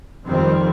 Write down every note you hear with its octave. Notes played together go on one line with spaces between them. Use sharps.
F2 D#3 G3 C4